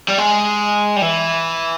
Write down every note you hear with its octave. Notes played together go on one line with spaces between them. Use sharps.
G3
G#3
G3
E3